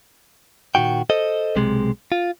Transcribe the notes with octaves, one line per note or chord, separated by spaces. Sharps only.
A#2 D#3 F#4 G5
A4 C5 D#5
B1 C3 G#3
F4